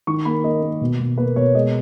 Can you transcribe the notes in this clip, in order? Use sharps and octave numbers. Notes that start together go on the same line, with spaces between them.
D#3 C#6
A#3 B5
A#3 D#5
A#3
B2
B2
A#3 B4
B2 C#5
G#3 D#5